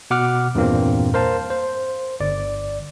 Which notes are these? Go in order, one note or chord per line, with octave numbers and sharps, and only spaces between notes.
B2 F#5 D6 F6
E2 G2 A#2 A#3 C4
A#4 C5 F5 A5
C5
G1 D5